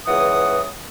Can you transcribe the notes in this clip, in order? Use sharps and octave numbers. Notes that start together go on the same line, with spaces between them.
C#2 E3 F#5 D#6